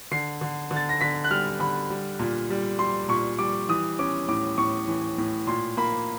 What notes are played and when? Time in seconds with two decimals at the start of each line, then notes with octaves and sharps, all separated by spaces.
0.11 D3 C7
0.41 D3
0.71 D3
0.76 A6
0.89 A#6
1.01 D3 B6
1.24 F#6
1.30 G3 F6
1.60 D3 B5
1.90 G3
2.19 A#2
2.50 G3
2.79 G3 C6
3.09 A#2 C#6
3.39 G3 D6
3.69 E3 D#6
3.99 C#4 D6
4.28 A2 D6
4.58 A2 C#6
4.88 E3
5.18 A2
5.47 A#2 C6
5.77 A#3 B5